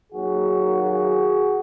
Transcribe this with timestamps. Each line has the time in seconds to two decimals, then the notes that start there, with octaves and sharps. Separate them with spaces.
0.13 D#2 D#3 F#3 A#3 F#4 G#4
0.83 F#4 G#4